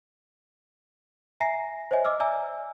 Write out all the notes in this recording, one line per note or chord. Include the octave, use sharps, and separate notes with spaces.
E5 G#5 A#5 A#6 C7
C5 C#5 D#5 E5 G#5
D#5 D6 E6 F6
D5 E5 G#5 A#5 E6